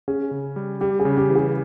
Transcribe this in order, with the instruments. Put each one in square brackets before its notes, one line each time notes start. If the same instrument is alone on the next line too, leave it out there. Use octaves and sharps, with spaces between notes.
[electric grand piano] C#4 [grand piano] G#4
[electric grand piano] C#3
G3
[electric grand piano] G3 [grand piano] G4
[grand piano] G#4
[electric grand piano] C#3
[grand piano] G4
[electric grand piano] E3
[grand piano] G#4